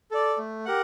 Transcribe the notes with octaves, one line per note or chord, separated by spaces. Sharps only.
A4 D5
A3
G4 A#4 F#5